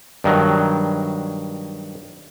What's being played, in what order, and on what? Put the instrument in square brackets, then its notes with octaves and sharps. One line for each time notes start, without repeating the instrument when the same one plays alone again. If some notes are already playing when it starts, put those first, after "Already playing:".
[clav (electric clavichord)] G2 D#3 F#3